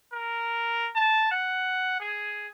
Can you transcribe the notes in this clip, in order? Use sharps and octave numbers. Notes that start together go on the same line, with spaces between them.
A#4
A5
F#5
G#4